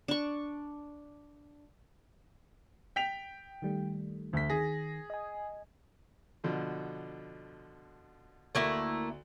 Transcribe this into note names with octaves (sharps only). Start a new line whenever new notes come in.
D4 C#6
G5 B6 F7
D#3 G3 A3
D2 B6
D#3 G#4 A#6
D#5 G#5
B2 D3 F3
D2 A3 A#3 E4 C#6